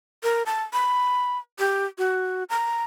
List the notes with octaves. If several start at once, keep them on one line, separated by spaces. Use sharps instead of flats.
A#4
A5
B5
G4
F#4
A#5